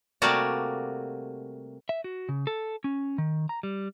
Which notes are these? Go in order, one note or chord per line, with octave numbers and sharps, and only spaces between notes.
C3 G3 A3 A#3 F#4 D5
E5
F#4
C#3
A4
C#4
D#3
A#5
G3